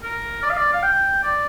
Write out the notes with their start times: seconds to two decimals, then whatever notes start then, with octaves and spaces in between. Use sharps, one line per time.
0.03 A#4
0.43 D5
0.50 F5
0.57 D5
0.73 F5
0.83 G5
1.23 D5